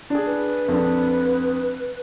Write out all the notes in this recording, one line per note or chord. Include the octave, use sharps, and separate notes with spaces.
D4 G#4
B4
F2 D4